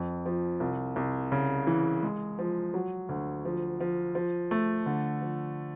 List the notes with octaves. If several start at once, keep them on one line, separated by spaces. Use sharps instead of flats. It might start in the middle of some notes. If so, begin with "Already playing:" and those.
Already playing: F2
F3
C2
C2
C#3
E3
G#3
F3
F#3
D2
F3
F3
F3
A3
D3
F3